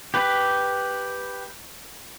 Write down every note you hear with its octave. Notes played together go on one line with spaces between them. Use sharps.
G4 B4